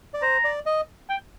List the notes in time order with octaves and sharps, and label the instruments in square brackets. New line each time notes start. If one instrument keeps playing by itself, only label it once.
[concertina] D5
[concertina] C5 [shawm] A#5
[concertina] D5
D#5
[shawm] G5